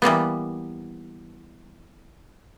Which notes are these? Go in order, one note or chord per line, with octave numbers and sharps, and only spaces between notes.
E3 G3 A#3 B3